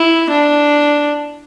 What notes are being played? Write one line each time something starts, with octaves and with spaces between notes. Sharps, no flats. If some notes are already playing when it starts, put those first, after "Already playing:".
Already playing: E4
D4